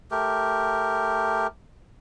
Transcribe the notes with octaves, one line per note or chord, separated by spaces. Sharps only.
A3 G4 A#4